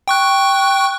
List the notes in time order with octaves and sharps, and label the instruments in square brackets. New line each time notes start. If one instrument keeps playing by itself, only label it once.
[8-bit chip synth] G5 C#6 F#6